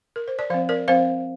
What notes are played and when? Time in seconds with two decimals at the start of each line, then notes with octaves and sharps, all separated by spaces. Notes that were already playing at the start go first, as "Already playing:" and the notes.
0.16 A#4
0.28 C5
0.39 D5
0.50 F3 C4 C5 F5
0.69 A#4 D5
0.88 F3 C4 C5 F5